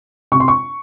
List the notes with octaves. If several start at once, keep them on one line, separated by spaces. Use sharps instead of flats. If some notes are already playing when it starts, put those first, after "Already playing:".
C3 C#6
C6
C#6